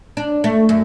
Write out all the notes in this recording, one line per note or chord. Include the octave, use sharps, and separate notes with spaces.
D4
A3
F#2